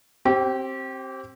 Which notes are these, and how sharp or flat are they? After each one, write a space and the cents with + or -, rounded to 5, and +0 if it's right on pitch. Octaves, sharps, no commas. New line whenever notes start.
C4 +20 G4 -25